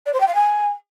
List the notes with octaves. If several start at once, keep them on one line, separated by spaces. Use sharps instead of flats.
D5
C5
G5
F5
G#5